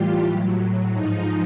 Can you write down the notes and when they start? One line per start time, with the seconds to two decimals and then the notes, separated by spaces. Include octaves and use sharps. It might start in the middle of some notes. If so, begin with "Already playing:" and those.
Already playing: A2 E3 G3 F4 G4
0.25 A2 F#3
0.93 G#2 F3 D#4